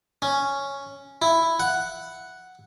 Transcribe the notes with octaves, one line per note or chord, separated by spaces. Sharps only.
C#4
E4
F#5